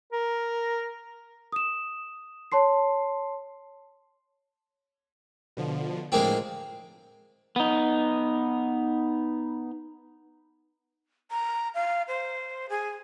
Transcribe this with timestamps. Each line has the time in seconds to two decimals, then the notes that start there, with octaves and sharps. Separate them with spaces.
0.13 A#4
1.52 D#6 E7
2.52 C#5 A5 C6 C7
5.57 B2 D3 F3
6.12 A2 D3 F3 G#3 A#3 C4
7.56 B3 D#4
11.31 A#5
11.75 F5
12.08 C5
12.70 G#4